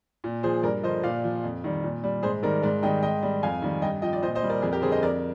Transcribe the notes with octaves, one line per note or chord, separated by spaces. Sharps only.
A#2
F3 G#4 C5
G2 A#4 D5
D3 F3 C5 D#5
A#2 D5 F5
F3
F2
D#3 G3
A#2
G3
G#2 G#4 C5
D#3 G3 A#4 D5
G#2 A#4 D5
D#3 G3 D#5 G5
G#2 D#5 G5
G3
F2 F5 G#5
D#3 G3
G2 D#5 G5
F3 D#5 G5
D5
A#2 C5 D#5
C5 D#5
G3
A#4 D5
F2 G#4
G4 A#4
D3 G3 G#4 C5
C5 D#5
F2 A#4 D5